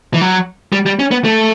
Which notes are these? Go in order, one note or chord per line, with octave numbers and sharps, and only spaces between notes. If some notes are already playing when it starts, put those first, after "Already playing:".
E3
F#3
G3
G3
C#4
B3
A3